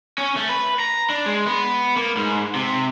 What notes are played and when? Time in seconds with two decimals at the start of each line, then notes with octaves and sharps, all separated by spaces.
0.18 C#4
0.36 A3
0.49 B4
0.80 A#5
1.10 D4
1.26 G#3
1.46 B3
1.96 A#3
2.17 G#2
2.55 C3